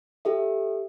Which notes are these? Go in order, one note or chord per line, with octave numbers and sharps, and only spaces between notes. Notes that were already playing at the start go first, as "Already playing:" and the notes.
G4 A4 E5